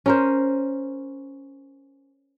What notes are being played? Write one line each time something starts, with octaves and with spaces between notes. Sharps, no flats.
C#4 A#4 C5